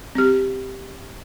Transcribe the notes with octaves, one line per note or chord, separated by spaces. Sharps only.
C4 G4